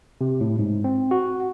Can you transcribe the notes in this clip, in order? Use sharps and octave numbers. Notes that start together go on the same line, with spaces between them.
C3
A2
G#2
C4
F#4